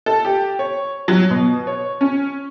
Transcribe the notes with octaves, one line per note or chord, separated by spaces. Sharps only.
A4
G4
C#5
F#3
B2
C#5
C#4